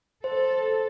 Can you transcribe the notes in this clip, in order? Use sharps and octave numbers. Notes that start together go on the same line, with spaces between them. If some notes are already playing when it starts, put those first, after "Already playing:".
A4 C5